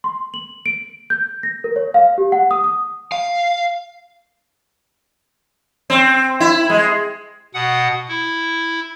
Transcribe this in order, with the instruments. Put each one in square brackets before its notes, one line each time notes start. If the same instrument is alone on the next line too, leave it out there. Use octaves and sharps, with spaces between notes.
[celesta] C6
F#7
D7
G6
A#6
A#4
C#5
F5
G4
F#5
D#6
D#6
[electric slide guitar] F5
[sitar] C4
E4
G#3
[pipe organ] B2 F#5 D#6
E4